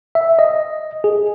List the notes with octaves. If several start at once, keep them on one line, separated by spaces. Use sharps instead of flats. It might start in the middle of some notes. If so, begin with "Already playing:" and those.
E5
D#5
G#4